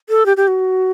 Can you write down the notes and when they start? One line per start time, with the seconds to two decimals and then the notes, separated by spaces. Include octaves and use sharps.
0.09 A4
0.26 G4
0.37 G4
0.48 F#4